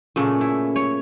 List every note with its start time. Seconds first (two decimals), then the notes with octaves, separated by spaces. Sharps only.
0.16 A#2 C#3 A3
0.41 E4
0.76 C#5